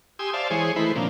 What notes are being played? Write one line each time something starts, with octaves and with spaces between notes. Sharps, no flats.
G4 G#5 C6 D#6 E6
C5 D5 E5 F5 A5
E3 G#3 G#4 C5 C#5
D#3 E3 A3 E4 B4 C5
A#2 C#3 F3 A#3 C4 D4